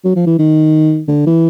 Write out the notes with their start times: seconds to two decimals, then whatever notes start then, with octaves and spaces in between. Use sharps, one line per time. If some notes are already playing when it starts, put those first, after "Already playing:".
0.04 F#3
0.16 F3
0.26 E3
0.38 D#3
1.08 D3
1.26 E3